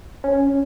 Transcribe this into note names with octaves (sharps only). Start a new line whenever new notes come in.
C#4